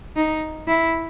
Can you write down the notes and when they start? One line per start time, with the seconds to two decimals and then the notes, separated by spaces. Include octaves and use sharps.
0.17 D#4
0.68 E4